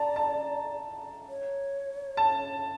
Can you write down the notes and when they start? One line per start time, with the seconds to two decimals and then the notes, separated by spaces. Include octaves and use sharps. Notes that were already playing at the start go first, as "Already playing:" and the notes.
Already playing: D5 A5 A#5
0.16 A5
1.29 C#5
2.17 A5